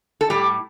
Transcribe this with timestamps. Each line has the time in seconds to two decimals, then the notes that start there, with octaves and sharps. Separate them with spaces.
0.21 A4
0.30 A2 G3 G4